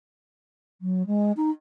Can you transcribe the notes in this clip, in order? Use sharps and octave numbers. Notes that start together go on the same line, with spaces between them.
F#3
G#3
D#4